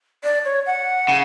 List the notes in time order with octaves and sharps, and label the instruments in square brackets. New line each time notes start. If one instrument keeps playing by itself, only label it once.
[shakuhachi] D5
C#5
F#5
[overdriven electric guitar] C#3